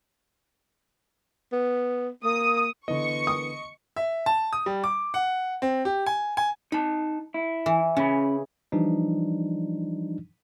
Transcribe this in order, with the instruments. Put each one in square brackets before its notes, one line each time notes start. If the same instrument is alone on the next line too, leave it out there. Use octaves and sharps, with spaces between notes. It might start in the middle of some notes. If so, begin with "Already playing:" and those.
[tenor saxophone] B3
[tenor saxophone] A#3 [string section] D#6
[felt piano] D3 E3 B3 [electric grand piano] D#5 [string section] C#6 C#7
[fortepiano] D#6
[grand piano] E5
A5
D#6
G3
D6
F#5
C4
G4
G#5
G#5
[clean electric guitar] D#4 A5 [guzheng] B5
[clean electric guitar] E4
[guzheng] E3
[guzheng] C#3 [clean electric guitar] C#4 B5
[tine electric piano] E3 F3 G3 D4 D#4